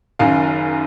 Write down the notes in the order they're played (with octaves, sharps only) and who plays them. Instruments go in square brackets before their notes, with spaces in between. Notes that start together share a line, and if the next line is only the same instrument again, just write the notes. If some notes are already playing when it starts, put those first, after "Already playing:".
[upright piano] F#1 F#2 D#3 F5